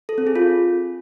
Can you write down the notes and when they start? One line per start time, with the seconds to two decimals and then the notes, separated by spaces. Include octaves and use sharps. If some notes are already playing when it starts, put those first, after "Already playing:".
0.09 A4
0.18 C4
0.27 G#4
0.36 F4